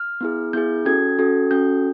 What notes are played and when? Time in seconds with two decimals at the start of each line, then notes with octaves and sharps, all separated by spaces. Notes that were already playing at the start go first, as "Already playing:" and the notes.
Already playing: F6
0.21 B3 E4 G#4
0.53 B3 E4 G#4 G6
0.85 C#4 F#4 A4 G#6
1.19 C#4 F#4 A4
1.51 C#4 F#4 A4 G6